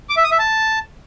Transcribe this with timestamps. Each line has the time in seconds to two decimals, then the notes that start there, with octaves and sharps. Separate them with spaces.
0.09 D6
0.17 E5
0.24 D#6
0.31 E5
0.39 A5